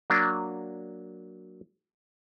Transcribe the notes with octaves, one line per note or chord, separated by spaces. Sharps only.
F#3 A#3 D4